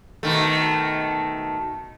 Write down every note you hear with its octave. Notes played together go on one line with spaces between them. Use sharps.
B2 D#3 A3